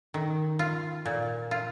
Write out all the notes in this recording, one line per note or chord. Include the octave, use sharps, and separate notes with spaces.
D#3
F4
A#2
F4